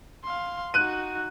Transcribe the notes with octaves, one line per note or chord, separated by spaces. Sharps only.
F5 C6
D#4 F#4 F#6 D#7